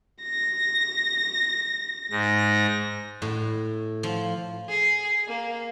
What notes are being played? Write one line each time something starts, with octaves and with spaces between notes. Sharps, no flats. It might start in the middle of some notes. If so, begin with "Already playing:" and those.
A#6
G#2 A#6
A2
F3
G#4
A#3